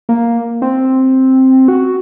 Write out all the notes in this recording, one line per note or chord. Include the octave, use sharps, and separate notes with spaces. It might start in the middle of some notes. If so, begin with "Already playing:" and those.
A#3
C4
F#4